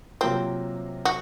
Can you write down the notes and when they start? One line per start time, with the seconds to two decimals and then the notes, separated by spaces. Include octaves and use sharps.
0.21 C3 F#3 A#3 C4 F4
1.05 F#4